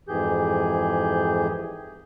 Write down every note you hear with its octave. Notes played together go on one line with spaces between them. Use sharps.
F2 G#2 E3 G4 G#4 G6